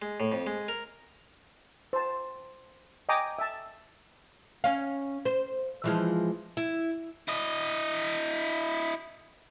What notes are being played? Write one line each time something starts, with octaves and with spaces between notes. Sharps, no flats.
G#3
A2
F2
G#3
A#4
C5 A5
D#5 G5 G#5 A#5 D6 D#6
E5 A5
C#4 F5
C5
E3 F3 G#3
E4
E4 D#5